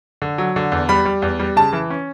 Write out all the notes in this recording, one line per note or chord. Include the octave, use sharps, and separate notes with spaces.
D3
F#3
D3
E2
G3 B5
G3
E2
G3
C#3 A5
E3
C#4